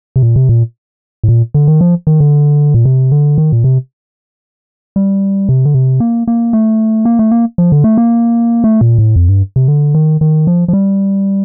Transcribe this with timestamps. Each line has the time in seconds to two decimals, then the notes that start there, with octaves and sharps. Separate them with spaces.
0.16 C3
0.23 A#2
0.36 C3
0.49 A#2
1.24 A2
1.28 A#2
1.54 D3
1.68 D#3
1.81 F3
2.07 D#3
2.20 D3
2.74 A#2
2.85 C3
3.12 D3
3.38 D#3
3.52 A#2
3.64 C3
4.96 G3
5.49 C3
5.66 D3
5.74 C3
6.00 A#3
6.28 A#3
6.53 A3
7.05 A#3
7.19 A3
7.31 A#3
7.58 F3
7.72 D3
7.84 A3
7.98 A#3
8.64 A3
8.81 A#2
8.98 A2
9.16 F2
9.29 G2
9.56 C3
9.68 D3
9.95 D#3
10.21 D#3
10.47 F3
10.68 F3
10.73 G3